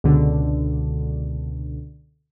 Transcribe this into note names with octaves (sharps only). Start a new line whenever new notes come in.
C#2 B2 D3